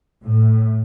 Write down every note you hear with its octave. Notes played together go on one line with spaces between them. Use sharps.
A2